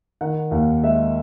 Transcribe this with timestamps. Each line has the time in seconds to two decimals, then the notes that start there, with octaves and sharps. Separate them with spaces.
0.21 D#3 F#5
0.51 D#2 F5
0.83 G#3 E5